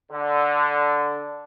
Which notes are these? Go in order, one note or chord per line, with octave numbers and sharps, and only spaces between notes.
D3